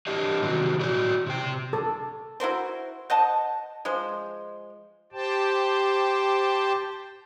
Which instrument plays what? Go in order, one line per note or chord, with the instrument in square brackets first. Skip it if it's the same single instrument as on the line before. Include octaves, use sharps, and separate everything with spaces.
[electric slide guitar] D4 E4 G4 C#5 D#5
C3 D#3 C4 F#4
E4 F#4 D5
C3 G5
[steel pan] A4
[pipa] E4 F#4 A#4 C5
C5 D#5 F#5 A5
F3 G#3 C5
[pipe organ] G4 C5 G5 A5